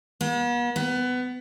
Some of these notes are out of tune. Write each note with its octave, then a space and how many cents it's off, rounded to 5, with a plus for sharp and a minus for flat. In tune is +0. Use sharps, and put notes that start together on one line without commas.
B3 -45
B3 +20